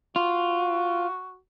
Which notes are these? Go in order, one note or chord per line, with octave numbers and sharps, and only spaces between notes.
F4 F#4